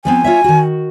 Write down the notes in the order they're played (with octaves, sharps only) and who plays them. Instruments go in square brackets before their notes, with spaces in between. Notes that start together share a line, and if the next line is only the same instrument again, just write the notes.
[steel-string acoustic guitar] F3 B3 C4 [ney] G#5
[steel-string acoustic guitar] F4 C#5 E5
D#3 F#4